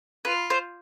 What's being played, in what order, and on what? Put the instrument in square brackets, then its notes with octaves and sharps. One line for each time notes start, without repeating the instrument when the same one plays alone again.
[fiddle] F4 [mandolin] B4
[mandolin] C5